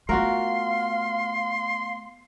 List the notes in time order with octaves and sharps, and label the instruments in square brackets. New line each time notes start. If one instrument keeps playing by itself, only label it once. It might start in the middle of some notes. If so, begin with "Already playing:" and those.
[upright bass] A3 B3 [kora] F4 F#4 A#4 [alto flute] F5 [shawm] C6